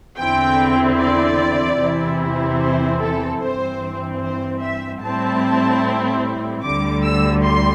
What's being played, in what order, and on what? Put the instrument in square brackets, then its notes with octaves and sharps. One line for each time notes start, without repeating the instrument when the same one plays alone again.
[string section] E2 D3 C4 E4 G5
D5
E2 C3 E3 C4 E4
C5
A4
G2 E3 C4 C5
C5
E5
A2 G3 C4 E4 A5
D2 D3 G3 D6
E6
C6